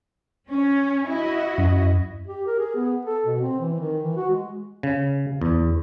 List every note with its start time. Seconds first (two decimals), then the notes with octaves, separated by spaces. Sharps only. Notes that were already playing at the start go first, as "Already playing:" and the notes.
0.49 C#4
1.08 E4 F#4 D#5
1.58 F#2
2.27 G4
2.47 A#4
2.59 G#4
2.76 B3
3.05 A4
3.25 B2
3.41 C4
3.60 E3
3.80 D#3
4.02 E3
4.16 F#4
4.30 G#3
4.83 C#3
5.42 E2